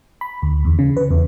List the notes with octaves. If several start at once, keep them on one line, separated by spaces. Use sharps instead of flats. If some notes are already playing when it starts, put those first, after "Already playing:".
B5
D2
E2
C#3
B4
E2